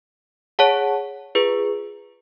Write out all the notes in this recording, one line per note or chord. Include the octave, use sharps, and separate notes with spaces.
G#4 C#5 F#5 A5
F4 G#4 B4